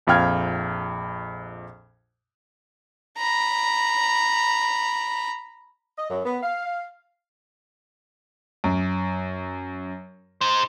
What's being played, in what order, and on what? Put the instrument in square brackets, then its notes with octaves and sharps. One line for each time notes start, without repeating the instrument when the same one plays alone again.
[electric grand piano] A#1 F2 F5 G5 F6 G#6
[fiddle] A#5 B5
[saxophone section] D#5
F#2
B3
F5
[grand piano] F#2
[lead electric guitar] D#4 C5